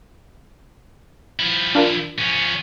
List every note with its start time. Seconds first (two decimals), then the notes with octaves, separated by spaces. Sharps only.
1.39 F3 E4
1.75 D4 F4 A#4
2.18 F3 C#4